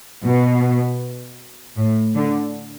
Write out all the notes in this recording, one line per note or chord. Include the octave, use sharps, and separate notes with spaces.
B2
A2
D3